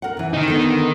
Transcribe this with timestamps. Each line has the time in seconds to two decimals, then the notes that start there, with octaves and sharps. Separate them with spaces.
0.02 A#4 F#5
0.17 C3 E3
0.33 D#3 D#4
0.48 D3 B3